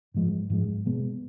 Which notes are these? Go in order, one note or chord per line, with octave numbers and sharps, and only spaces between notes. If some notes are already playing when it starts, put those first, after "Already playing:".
G#2 F3 G#3
G#2 F3 G#3
B2 G#3 B3